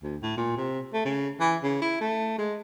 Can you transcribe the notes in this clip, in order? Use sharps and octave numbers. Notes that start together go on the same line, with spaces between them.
D2
A2
A#2
C3
A3
C#3
E3
C#3
E4
A3
G#3